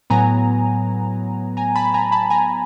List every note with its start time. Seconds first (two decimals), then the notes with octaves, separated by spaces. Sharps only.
0.10 A2 F#3 B3 G#5 A#5
1.57 G#5 A#5
1.75 A5 B5
1.94 G#5 A#5
2.12 A5 B5
2.30 G#5 A#5